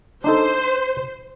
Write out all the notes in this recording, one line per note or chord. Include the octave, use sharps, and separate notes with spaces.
D4 D#4 A4 C5